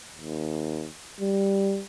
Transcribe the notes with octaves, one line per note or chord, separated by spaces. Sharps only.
D#2
G3